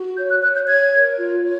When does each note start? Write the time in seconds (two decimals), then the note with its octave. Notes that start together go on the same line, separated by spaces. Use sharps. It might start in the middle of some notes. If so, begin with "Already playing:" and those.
Already playing: F#4
0.16 C#5 G6
0.29 F#6
0.42 C#5 F#6
0.55 G6
0.67 C#5 G#6
0.93 A#4
1.17 F4
1.43 C#5